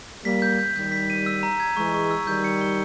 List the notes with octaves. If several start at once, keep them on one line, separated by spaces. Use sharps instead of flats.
G3 A#3 B6
G6
G6
D#3 G3 G6
B6
D#7
E6
A#5
G#6
E3 G#3 C#6
C#6
E6
D#3 G3 G6
C#7
G7